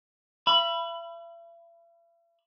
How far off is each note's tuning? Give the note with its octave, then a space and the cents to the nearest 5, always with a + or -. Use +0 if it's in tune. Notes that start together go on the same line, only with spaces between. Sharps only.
E5 +45 B5 +0